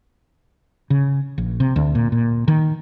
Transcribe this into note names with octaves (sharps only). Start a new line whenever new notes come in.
C#3
A#1
C3
D2
A#2
A#2
D#3